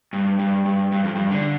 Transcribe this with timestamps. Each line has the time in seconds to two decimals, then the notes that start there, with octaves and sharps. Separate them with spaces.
0.13 G2
0.39 G2
0.65 G2
0.92 G2
1.04 F2
1.15 G2
1.31 D3